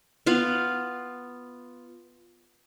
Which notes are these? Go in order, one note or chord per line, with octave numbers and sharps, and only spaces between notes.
B3 F4 F5